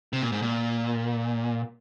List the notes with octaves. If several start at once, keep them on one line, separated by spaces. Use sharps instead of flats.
C3
A#2
G#2
A#2